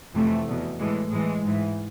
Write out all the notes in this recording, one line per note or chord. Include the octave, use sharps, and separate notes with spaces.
F2 C3 E3 A3
E2 B2
A2 E3 G#3
A2 E3 G#3
G#2 E3